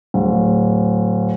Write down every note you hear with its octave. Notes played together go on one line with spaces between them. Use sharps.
D1